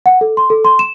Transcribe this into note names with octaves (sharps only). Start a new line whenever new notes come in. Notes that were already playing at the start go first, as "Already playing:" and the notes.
F#5
A4
C6
A4
C6
E7